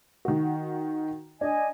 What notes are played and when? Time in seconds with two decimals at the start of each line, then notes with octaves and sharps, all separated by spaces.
0.25 D#3 F#4
1.41 D4 D#5 G#5